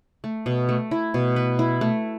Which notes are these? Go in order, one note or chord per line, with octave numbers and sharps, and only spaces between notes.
A3
B2
A3
E4
B2
B4
E4
A3